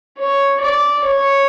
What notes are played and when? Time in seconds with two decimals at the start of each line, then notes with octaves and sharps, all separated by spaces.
0.18 C#5
0.60 D5
1.04 C#5